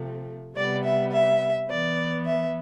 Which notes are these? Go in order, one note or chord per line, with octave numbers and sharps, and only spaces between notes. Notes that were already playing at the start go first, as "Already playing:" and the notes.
Already playing: C3 F3 A3
C3 G3 B3 D5
E5
E5
E3 B3 D5
E5